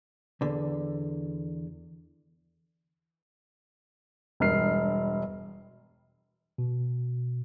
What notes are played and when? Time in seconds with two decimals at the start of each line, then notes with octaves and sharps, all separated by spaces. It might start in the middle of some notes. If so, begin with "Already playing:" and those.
0.41 E2 D3
4.40 E1 G2 A#4 F6 C7
6.58 B2